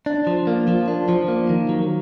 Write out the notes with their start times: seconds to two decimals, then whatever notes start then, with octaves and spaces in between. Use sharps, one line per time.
0.06 D4
0.27 F3
0.47 A#3
0.68 F3
0.88 D4
1.09 F3
1.28 A#3
1.49 D#3
1.69 F#3